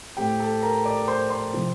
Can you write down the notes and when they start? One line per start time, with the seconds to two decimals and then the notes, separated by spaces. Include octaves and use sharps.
0.17 A2 A3 C4 G4 G5
0.40 A4 A5
0.63 A#4 A#5
0.85 D5 D6
1.08 C5 C6
1.30 C5 C6
1.52 C3 F3 C4